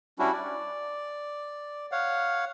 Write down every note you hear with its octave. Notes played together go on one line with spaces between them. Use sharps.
G3 C#4 D4 E4 F#4
D5
C#5 F5 F#5